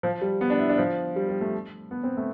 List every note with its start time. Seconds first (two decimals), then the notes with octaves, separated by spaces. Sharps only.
0.03 F3
0.21 G3
0.41 B3
0.50 D4
0.59 E4
0.69 D4
0.78 F3
1.16 G3
1.29 G3
1.41 A3
1.91 B3
2.04 C4
2.17 A3